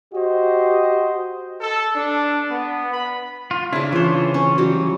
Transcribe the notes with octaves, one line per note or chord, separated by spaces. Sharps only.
F#4 G4 C5 D#5
A4
D4
B3
B5
F4
C#3 D4 E4
E3 F4 C5 C#5
C#4 C#5
F#3 G3